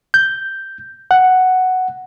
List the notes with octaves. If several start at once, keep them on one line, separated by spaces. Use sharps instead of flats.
G6
F#5